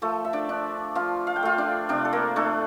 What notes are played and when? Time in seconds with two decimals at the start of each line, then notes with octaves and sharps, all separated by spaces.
0.02 F3 A3 A4
0.25 E5
0.33 D4 D5
0.49 D4
0.95 F3 F4 F5
1.27 F5
1.36 G5
1.43 A3 F4 F5
1.58 D4 D5
1.89 C3 D4 D5
2.05 A4
2.13 A#3 A#4
2.36 A3 D4 A4